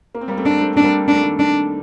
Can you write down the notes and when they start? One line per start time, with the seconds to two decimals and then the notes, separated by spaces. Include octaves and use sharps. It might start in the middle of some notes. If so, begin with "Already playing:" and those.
0.15 A#3
0.21 C4
0.28 G3 A#3
0.37 A3 C4
0.46 D4
0.61 A3 C4
0.73 C4 D4
0.84 G3 A#3
1.08 G3 D4
1.15 A3
1.23 D#3 G3
1.39 D4